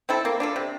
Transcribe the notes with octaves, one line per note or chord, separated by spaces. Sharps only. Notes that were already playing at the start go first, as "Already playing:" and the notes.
C4 E4 A4
A#3
D4 F4 A4
C3